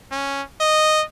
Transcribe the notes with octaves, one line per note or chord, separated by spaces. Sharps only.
C#4
D#5